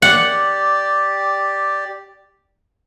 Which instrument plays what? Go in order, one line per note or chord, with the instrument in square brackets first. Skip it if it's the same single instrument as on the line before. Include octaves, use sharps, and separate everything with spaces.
[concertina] G4 D5 [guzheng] F#5